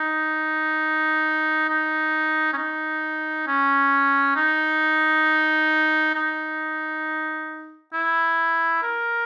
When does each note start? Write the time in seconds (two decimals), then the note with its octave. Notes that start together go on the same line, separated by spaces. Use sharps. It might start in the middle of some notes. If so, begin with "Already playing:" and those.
Already playing: D#4
1.69 D#4
2.53 C#4
2.57 D#4
3.47 C#4
4.35 D#4
6.15 D#4
7.93 E4
8.82 A#4